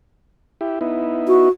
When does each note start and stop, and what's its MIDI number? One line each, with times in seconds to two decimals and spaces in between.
0.61 0.79 64
0.61 0.79 67
0.81 1.49 59
0.81 1.49 63
0.81 1.49 64
1.28 1.50 66